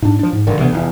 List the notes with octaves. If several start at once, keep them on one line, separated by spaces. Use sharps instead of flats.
G#2 D4
F3 D4
G#2
A1 G2 D3 D#3
D2 C3 E3 B3
F1 E2 E3